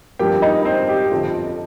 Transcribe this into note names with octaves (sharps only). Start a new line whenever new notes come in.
G2 F3 A#3 G4 G5
D#4 D#5
C4 C5
G4
G1 F2 F3